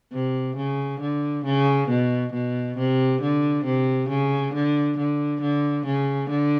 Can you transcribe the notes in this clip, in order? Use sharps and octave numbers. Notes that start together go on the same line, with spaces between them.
C3
C#3
D3
C#3
B2
B2
C3
D3
C3
C#3
D3
D3
D3
C#3
D3